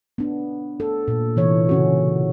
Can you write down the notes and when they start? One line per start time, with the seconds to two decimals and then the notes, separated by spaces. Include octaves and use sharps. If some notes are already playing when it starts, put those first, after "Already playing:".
0.18 B3 D4
0.80 A4
1.08 A#2
1.36 C3 E3 C#5
1.69 C#3 C#4 F#4